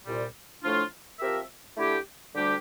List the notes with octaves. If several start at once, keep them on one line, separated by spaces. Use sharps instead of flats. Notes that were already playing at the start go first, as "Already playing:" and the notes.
C2 A#2 G3
A2 F3 A3 D4 F4
F3 C4 G4 A#4 E5
D3 A3 E4 G4
D2 D3 G3 D4 G4